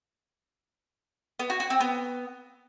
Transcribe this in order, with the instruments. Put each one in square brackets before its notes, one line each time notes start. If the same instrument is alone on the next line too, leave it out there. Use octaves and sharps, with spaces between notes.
[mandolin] B3
F#4
F#4
C4
B3